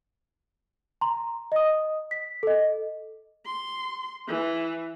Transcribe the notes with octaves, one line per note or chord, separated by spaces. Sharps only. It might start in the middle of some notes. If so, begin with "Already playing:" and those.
A#5 C6
D#5 D#6
B6
A4 D#5
C6
E3